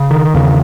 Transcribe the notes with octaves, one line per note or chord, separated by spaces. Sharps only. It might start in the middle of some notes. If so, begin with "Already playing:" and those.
Already playing: C#3
D#3
E2 C#3